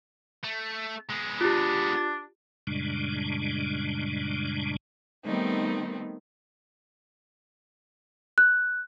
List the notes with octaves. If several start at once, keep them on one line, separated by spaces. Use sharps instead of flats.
A3
G#3 B3
D4 F4 G4
F#2 A#2 C#3 G3 G#3 D4
D#3 G3 A3 B3 C4 D#4
F#6